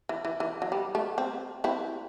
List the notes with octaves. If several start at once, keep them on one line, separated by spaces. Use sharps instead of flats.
E3
E3
E3
F#3
G3
A3
C4
C4 E4